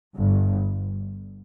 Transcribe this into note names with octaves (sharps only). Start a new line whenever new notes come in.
G1 G2